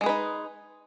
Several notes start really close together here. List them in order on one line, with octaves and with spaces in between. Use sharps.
G#3 G#4 B4 D#4